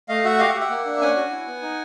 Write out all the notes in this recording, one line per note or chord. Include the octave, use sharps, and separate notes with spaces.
A3 D#5 F5
F#4 E5 F#5
G4 D#5 F5
E5 F#5
G4
E5 F#5
A#3
D4
C#4 F#5 G#5
F#4
E4
B3
D#4